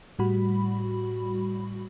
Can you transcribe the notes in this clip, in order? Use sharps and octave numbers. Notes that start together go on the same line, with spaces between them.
A2 G3 F#4 B5